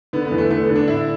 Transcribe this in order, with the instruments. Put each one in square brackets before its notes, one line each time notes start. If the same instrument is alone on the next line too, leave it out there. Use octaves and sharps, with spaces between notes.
[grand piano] D3 B3
B3
E2
A3
D3 A3
B3
D3
D4
A2 E4